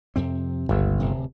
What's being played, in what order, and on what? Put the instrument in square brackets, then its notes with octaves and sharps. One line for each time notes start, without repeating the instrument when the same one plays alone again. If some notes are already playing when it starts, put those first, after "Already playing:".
[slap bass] F2 C3 C4
[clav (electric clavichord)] G1 [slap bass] C#2
[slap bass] D1 C3